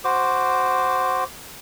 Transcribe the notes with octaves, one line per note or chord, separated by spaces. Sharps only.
F#4 C5 D6